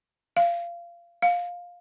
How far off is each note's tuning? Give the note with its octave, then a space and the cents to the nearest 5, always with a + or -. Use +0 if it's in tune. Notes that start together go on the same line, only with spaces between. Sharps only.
F5 -25
F5 +15